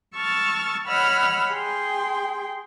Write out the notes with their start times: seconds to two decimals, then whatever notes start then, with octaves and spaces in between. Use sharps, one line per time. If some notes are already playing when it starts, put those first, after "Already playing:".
0.15 A5 C#6 E6 F6 A6
0.87 C#5 D#5 F#5 B5 E6 F6
1.52 G#4 G5 C6